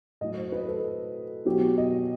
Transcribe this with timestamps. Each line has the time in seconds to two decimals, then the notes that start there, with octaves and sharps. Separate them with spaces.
0.21 A2 F#3 D#5
0.37 C5
0.52 B4
0.68 A4
1.45 B2 F#3 G4
1.78 D#5